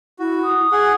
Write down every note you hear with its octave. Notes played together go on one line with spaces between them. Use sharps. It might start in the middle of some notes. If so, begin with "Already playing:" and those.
E4 F#4
D#6
G#4 F#5